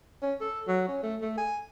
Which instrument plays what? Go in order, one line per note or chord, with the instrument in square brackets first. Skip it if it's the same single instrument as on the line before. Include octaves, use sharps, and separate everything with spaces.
[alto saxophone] C#4
A4
F#3
C#4
A3
A3
G#5